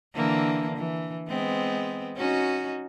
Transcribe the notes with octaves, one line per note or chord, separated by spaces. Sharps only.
D3 E3 A#3
E3
G#3 B3 C4
C#4 D#4 F#4